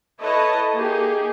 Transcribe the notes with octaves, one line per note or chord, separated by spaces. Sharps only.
E4 A4 B4 C#5 D#5
A#3 D#4 G4 G#4